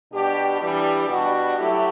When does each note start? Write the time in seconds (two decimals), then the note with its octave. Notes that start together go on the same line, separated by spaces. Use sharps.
0.13 B2 G3 D4 G4
0.61 E3 G3 D4 G4
1.09 B2 G3 D4 F#4
1.57 F#3 A3 E4 G4